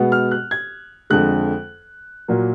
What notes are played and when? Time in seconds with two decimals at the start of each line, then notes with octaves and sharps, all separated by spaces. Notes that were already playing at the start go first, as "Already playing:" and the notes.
Already playing: B2 G#3 B3
0.12 F6
0.31 F#6
0.51 G#6
1.10 F2 D3 G#3 F#6
2.28 A#2 F#3 A#3